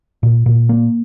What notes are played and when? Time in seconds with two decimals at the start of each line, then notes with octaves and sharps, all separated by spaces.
0.23 A#2
0.46 A#2
0.69 A#3